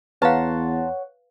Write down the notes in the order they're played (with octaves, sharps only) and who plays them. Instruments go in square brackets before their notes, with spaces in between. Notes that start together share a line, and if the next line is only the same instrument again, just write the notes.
[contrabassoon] E2 [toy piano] B4 F5 [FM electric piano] C#5 F#5 [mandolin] A5 A#5 C6